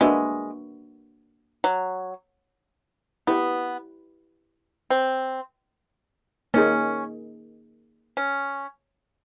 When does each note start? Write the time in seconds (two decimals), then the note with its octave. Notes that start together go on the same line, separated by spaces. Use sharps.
0.01 G#3 A#3 D4 F#4 B4 E5
1.64 F#3
3.27 B3 E4 G4 B4
4.90 C4
6.54 A#3 C#4 D#4 G#4
8.17 C#4